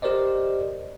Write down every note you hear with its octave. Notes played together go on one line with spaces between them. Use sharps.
G4 A#4 C5 D5 D#5